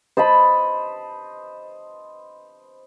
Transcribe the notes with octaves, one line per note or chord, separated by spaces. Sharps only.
C5 D#5 A5 B5